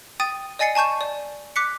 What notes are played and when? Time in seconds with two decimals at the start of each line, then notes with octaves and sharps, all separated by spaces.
0.20 G5 D#6 A6 D#7
0.59 D5 D#5 G#5 A6 C7 C#7
0.75 G#5 A5 C#6 G6 E7
1.01 D5
1.56 D6 F#6 B6 C#7